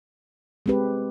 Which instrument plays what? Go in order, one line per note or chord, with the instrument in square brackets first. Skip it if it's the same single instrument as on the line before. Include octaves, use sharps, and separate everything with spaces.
[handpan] G#3 C4 G4 B4